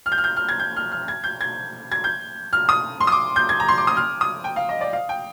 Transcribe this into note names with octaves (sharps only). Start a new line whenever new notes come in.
F6
G6
F6
G6
F6
G#6
G6
F6
F6
G#6
G6
G#6
G#6
G6
F6
D#6
C6
D#6
D6
G6
G#6
A#5
C6
D6
D#6
F6
D#6
G5
F5
D#5
D5
F5
G5